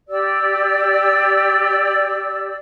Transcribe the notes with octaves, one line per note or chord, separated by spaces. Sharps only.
G4 D5 E6